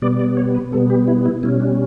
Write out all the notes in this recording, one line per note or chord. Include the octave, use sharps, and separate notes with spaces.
B2 G3 B3 D5
D5
C#5
B4
B2 G3 B3 A4
G4
E4
E4
B2 G3 C#4 E4
D4